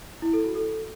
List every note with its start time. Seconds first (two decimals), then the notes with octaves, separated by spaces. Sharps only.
0.22 E4
0.33 A4
0.44 F#4
0.55 A4